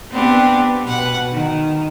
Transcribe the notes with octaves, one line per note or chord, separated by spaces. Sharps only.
B3 C4 D4 G4
B2 B4 F#5
D#3